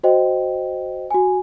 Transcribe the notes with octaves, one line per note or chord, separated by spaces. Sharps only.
F#4 C5 D#5 G5
F#4 G#5